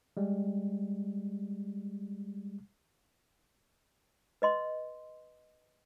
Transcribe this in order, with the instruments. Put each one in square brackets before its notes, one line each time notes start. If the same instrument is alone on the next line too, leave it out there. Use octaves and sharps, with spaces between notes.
[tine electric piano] G3 G#3
[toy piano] B4 D#5 C6